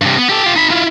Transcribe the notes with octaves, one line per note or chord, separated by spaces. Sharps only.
G2 C3
B3
G4 A4
F4 G4
D#4 B5
E4 F4